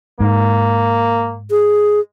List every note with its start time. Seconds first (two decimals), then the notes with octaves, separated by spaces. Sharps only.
0.20 G#2 A#3
1.50 G#4